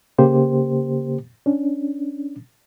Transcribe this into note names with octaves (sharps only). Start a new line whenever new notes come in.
C#3 A#3 G4 C5
C#4 D4